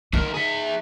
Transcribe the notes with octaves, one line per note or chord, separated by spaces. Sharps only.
D2 D#4 A#4
G#4 E5